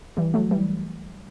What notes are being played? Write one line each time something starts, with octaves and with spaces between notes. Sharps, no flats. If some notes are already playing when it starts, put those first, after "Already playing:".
E3 G3
F#3 A3
E3 G3